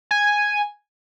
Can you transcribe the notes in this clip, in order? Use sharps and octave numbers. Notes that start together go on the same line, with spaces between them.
G#5